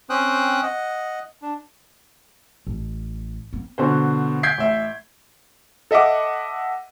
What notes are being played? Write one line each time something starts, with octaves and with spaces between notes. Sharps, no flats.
C4 C#4 C5 G5 D#6 F#6
D#5 F#5
D4
A1
A#3 B3
B2 D3 C5
G6 G#6 B6 C7 D7
A1 E5
A4 D#5 E5 F#5 D6